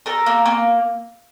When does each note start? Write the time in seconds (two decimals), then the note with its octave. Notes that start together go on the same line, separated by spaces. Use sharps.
0.06 A4 A#4
0.26 A#3
0.46 A#3